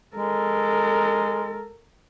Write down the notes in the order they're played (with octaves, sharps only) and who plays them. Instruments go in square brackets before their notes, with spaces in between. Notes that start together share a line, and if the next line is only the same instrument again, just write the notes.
[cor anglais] G#3 [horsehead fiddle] A4 A#4